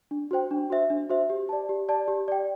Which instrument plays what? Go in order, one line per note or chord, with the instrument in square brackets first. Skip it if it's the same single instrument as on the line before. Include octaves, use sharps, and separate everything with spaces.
[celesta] D4
F#4 C5 G5
D4
F#4 C5 E5
D4
F#4 C5 E5
G4
D5 A5
G4
D5 A5
G4
D5 G5